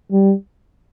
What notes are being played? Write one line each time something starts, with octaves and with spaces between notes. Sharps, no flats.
G3